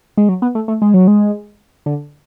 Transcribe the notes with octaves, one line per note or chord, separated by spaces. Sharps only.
G#3
F#3
B3
A3
A3
G#3
F#3
G#3
D3